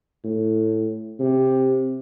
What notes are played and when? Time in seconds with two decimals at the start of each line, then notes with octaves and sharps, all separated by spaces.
0.24 A2
1.20 C3